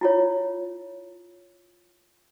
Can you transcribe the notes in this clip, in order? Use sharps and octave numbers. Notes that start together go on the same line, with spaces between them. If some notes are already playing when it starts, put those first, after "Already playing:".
E4 F4 C#5